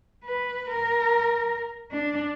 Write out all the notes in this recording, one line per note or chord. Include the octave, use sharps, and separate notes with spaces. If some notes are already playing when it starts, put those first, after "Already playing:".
B4
A#4
D4